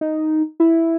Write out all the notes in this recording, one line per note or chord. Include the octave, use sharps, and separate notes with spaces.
D#4
E4